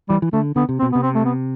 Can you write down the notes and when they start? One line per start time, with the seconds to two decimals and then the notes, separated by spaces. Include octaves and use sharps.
0.09 E3 G3
0.22 E3
0.33 D3 A3
0.56 D3 B3
0.69 C3
0.79 C4
0.82 B2
0.92 C3 B3
1.02 C4
1.15 A3
1.25 B3